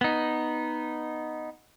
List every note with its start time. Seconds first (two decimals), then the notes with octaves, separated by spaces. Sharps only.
0.01 B3 D#4